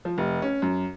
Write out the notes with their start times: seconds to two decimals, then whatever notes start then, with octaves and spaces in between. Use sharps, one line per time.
0.05 F3
0.18 F1
0.42 C#4
0.62 F#2